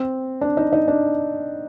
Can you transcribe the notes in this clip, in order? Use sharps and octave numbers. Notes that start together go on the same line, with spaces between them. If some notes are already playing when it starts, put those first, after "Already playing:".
Already playing: C4
D4
D#4
D#4
D4